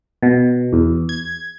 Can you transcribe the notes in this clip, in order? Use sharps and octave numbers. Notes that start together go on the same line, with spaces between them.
B2
E2
G#6